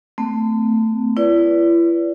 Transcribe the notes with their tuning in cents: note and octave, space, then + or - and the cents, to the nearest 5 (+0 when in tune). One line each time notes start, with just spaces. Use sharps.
A3 +15 C4 -40
E4 +40 B4 +0 D5 -25